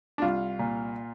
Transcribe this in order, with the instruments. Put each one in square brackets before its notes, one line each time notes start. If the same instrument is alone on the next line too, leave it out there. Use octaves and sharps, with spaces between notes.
[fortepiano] D4
C2 F4
A#2